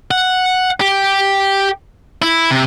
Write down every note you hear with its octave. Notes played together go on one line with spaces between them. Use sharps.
F#5
G4
E4
C3